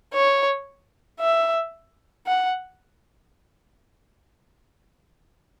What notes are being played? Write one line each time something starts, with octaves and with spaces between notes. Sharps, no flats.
C#5
E5
F#5